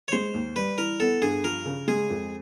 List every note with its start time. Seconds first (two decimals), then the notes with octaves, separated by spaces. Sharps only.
0.08 C#5
0.12 G#3 C5
0.34 D#2
0.56 G3 B4
0.78 E3 A#4
1.00 B3 A4
1.21 G2 G#4
1.44 F3 A#4
1.66 C#3
1.88 G#3 G#4
2.10 F2